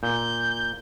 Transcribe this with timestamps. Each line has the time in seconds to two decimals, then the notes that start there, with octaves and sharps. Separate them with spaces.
0.03 A#2 G6